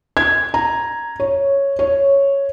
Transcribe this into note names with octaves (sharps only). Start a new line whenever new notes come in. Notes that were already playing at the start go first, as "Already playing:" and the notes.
G#6
A#5
C#5
C#5